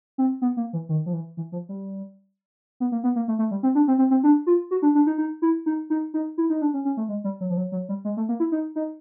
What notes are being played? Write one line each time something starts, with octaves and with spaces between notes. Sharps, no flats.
C4
B3
A#3
E3
D#3
F3
E3
E3
F3
G3
B3
A#3
B3
A#3
A3
A3
G3
C4
D4
C4
C4
C4
D4
F4
F#4
D4
D4
D#4
D#4
E4
D#4
D#4
D#4
E4
D#4
D4
C#4
C#4
A3
G#3
G3
F#3
F3
F#3
F#3
G3
G#3
A3
A#3
E4
D#4
D#4